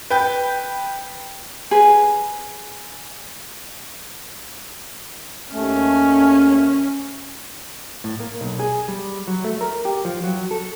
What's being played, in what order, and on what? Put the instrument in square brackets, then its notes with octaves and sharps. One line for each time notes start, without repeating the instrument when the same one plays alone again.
[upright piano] B4 G5 G6
[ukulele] G#4 B4
[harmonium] D#2 A3 [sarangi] C#4
[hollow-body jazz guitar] A2
A#3
B1
G#4
G3
F#3
A3
A#4
G4
F3
F#3
A4